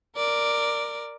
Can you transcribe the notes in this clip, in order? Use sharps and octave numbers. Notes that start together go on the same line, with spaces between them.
A#4 D5